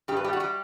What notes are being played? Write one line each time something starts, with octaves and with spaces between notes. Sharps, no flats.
G2 G4
B4
G3 G4
F#4
G3 G4